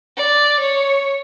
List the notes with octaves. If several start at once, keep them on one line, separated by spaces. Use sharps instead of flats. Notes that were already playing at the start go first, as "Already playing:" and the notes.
D5
C#5